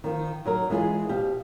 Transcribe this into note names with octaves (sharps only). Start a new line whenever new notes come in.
D#3 F3
F#3 D#4 A#4
E3 G#3 F4 G#4
B2 G4 C5 F5